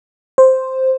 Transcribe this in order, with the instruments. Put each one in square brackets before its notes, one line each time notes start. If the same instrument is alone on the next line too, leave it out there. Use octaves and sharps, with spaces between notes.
[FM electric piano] C5